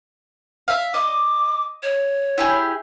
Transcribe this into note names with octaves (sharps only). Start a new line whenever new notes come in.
E5 F5
D#5 D6
C#5
E4 G4 G#4